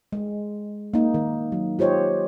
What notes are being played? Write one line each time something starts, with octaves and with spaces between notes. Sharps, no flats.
G#3
A#3 D#4
D#3
F#3
F4 G4 C5 C#5 D#5